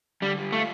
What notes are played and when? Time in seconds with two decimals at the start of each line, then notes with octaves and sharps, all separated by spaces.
0.22 D3 G3
0.37 G3
0.52 A3 F4